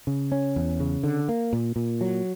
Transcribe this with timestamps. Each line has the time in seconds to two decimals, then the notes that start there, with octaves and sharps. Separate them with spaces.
0.07 C#3
0.32 C#4
0.56 E2
0.80 C#3
1.03 D3
1.29 A#3
1.53 A#2
1.76 A#2
2.01 F#3